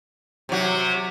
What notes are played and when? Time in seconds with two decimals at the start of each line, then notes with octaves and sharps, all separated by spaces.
0.49 C3 F#3